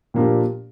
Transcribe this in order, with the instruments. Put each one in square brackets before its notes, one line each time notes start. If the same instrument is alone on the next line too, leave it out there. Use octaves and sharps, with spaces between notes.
[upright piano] A#2 F3 A#3 D4 G4